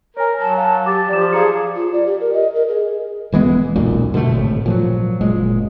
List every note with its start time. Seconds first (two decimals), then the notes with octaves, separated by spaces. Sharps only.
0.17 A#4 C#5 G#5
0.41 F#3 A5
0.58 F5 A5
0.86 G4 D6 A6
1.09 F3 D5 D6 E7
1.33 G#4 F5 A#5 C#7
1.76 F4
1.93 D5
2.06 G4
2.20 A#4
2.34 D#5
2.55 A#4
2.69 G#4
3.32 E1 E3 G#3 B3
3.76 D#1 B1 F#2 A#2
4.14 B2 D3 F#3 A3
4.32 G#1 A2
4.66 A#2 F3 F#3
5.21 F#1 A#2 G#3